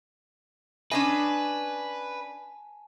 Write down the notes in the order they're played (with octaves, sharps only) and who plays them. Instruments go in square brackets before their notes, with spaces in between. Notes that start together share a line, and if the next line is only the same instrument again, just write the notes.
[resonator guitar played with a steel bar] C#4 D4 D#5 [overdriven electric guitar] B4 [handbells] G#5 A5